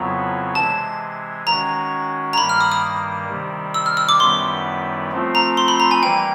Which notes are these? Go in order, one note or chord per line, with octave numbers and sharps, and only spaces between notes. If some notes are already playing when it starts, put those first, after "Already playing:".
Already playing: F2 C#3 F#3 B3 E4 A#5
C3 E3 G#3 A5
D#3 G#3 C#4 F#4 A#5
A#5
G2 D#3 G3 A#3 B5
F6
D#6
D#6
C3 D#3 G3
E6
F6
E6
D6
F#2 D#3 G3 B3 E4 C6
F3 A3 C4 F4
A#5
C6
B5
A#5
G#5
E3 G3 A#3 G5